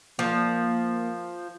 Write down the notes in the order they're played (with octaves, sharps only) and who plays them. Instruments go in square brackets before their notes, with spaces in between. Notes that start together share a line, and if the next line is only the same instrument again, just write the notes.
[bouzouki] F3 [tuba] A#3